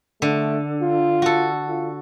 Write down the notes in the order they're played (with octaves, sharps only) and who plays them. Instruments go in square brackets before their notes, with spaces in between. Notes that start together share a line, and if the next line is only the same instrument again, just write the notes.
[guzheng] D3 [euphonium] A3
[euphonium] F4
[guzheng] F#4 A4
[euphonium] F4